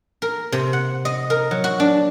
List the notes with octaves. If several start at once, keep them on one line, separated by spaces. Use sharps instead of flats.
A#4
C3
F#5
D#5
A#4
F#3
F#4
D4